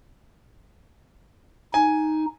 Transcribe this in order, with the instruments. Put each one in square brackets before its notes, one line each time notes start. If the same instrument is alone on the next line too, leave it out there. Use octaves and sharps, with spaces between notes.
[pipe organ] D#4 [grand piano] G#5